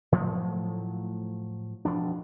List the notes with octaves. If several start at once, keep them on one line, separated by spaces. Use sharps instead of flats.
A2 F3 F#3 A3
E1 F3 D4